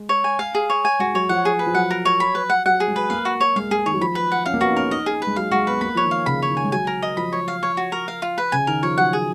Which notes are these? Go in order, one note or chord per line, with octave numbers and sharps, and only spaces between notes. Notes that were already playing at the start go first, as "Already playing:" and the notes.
Already playing: G#3
C#5
G#5
F5
G#4
C#5
G#5
G#3 F#4
F#3 C#5
F3 F#5
G#4
B4
F3
F#3 F#5
A#4
C#5
B5
B4
F#5
F#3 F#5
G#4
G#3
B4
A#3 F5
F#4
C#5
G#3 F5
G#3 G#4
D#3 C#5
F#3
F3 B5
B4
F#5
C#4 F5
A#3
B3 F#4
D#4
C#4 A#4
D#4 D#5
G#4
B4
G#3
F#3 F5
G#3 F#4
B3 B4
A#3 B5
F3 C#5
D#3
F5
C#3 B5
C#5
D#3
G#5
G#3
F#3 G#5
A#4
D#5
F3 B5
C#5
F5
C#5
F#4
A#4
F5
F4
B4
C#3 G#5
D#3 A#4
F3 C#5
F#3 F#5
G#4